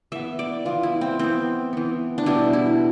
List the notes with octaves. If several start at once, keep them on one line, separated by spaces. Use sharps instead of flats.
E3 B3 E5
D5
E3 B3 F4
E4
C4
E3 B3 C4
E3 B3
D4
B2 G3 B3 E4
E4